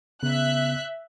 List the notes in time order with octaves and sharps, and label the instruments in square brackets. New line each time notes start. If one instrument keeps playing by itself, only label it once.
[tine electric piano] C#3 B3 [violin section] E5 F#6